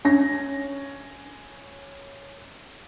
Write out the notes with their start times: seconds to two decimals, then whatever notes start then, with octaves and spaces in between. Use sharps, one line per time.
0.05 C#4 A#6